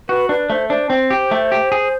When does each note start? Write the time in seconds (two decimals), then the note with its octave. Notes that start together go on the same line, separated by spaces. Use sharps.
0.09 F#4 B4
0.29 D4 B4
0.50 A3 C5
0.69 D4 C5
0.90 C4 C5
1.10 G4
1.31 A3
1.52 G4
1.72 G#4